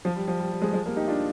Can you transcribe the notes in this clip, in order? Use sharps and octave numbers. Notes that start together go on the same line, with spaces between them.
F3
G3
F3
G3
G3
F3 G#3
F3 G#3
G3 A#3
D#4 G4
D4 F4